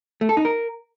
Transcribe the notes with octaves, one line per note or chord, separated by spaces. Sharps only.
A3
A4
D#4
A#4